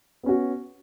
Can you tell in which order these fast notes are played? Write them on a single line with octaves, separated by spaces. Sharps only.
B3 C#4 F#4